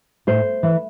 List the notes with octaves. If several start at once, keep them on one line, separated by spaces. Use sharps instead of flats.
A2 C5
E3